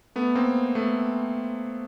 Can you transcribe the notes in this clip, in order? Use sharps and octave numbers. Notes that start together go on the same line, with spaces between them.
A3 B3
A#3 C4
A3 B3